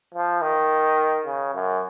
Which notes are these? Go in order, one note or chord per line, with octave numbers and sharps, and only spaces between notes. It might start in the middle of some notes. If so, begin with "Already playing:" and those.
F3
D#3
C#3
F#2